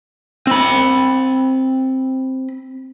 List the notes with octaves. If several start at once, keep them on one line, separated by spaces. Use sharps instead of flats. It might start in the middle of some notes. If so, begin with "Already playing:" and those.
C4 B5